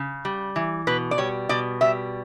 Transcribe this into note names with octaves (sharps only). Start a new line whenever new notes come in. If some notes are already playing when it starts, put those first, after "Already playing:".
Already playing: C#3
G3
E3
B2 B4
D5
G3 C#5
B2 D5
G3 E5